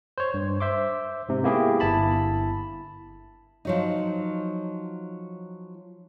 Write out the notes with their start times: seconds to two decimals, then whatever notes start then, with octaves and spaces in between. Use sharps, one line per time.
0.18 C5 C#5
0.34 G2
0.60 C5 E5 C6 D6
1.29 G#2 C3
1.44 A#3 B3 E4 G4 G#4
1.80 G1 E4 A5 B5
3.65 F3 F#3 D#4